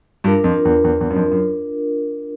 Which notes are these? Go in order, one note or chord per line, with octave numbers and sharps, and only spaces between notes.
G2 D4 F4 A#4
F2
E2
E2
E2
F#2
F2
F#2